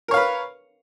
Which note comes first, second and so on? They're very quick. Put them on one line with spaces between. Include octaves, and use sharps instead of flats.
A#4 C#5 F5 B4